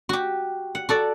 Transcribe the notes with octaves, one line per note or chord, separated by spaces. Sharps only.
F#4 G4
F#5
F#4 A4 D5